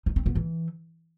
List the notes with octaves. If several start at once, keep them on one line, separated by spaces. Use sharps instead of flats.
D#4
C4
B3
E3